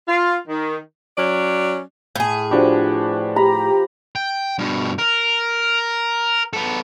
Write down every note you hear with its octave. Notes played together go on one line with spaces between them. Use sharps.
F4
D#3
F#3 C#4 D5
A2 G#4
F3 D4 F#4 G4 B4
G4 A#5 B5
G5
G2 B2
A#4
B3 A4